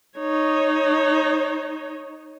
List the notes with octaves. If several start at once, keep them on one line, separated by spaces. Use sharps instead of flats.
D#4 C#5